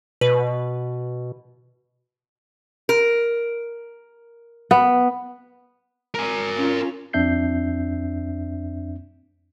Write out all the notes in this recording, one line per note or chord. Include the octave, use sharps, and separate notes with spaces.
B2 B4
A#4
B3
A#4 G#5
C#4 F4
F2 C4 D4 E5 G6 C7